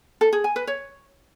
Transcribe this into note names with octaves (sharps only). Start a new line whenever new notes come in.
A4
G#4
G#5
B4
C#5